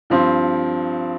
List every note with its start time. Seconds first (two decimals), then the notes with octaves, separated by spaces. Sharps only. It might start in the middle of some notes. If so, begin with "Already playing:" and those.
0.10 G2 F3 C4